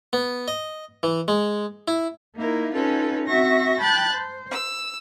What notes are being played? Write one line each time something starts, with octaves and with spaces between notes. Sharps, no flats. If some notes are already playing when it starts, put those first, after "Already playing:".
B3
D#5
E3
G#3
E4
A#3 D#4 E4 A#4
C#4 D#4 F4 A4 B4
C4 F#4 E5 C#6 A#6
G5 A5 B5 F#6 G6 A6
C5
E6